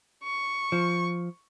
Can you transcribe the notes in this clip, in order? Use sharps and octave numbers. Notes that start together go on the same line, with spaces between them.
C#6
F3